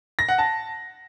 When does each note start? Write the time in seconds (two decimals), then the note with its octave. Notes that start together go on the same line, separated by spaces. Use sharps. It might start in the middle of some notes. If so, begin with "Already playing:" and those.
0.19 A#6
0.29 F#5
0.38 A5